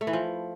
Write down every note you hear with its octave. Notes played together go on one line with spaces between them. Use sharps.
A3
E3
F3